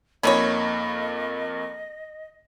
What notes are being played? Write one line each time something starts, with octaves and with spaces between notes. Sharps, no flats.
F2 A#3 C#4 D#4 C#5 D#5 B5